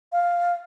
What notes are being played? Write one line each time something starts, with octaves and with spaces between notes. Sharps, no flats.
F5